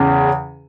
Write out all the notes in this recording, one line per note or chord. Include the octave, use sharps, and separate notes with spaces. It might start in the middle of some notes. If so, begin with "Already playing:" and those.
Already playing: E2 C#3